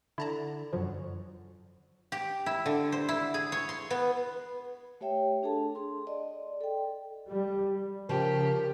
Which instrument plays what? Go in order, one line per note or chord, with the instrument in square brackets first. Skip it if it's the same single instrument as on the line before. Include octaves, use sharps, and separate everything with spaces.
[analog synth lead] D3 [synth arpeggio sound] E4 A5 A#5
[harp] F#2 F#3 [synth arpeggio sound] F3
[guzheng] G4
E4
D3
C5
E4
G#4
C#5
C6
B3
[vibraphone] A3 G4 C#5 E5 G5
D4 G#4 A4 A5
G#4 C6
D5 D#5
A4 G5
[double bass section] G3
[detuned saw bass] C#3 [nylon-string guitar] F3 [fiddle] G4 [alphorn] A#4